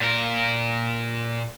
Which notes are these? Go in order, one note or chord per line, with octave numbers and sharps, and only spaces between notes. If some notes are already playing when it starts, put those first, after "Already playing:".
A#2 A#4